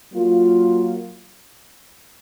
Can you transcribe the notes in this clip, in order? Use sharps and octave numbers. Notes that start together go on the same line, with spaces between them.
F#3 A#3 F4